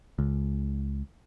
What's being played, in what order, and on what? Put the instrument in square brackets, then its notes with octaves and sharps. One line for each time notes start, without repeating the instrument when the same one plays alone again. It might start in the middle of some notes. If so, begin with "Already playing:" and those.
[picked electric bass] C#2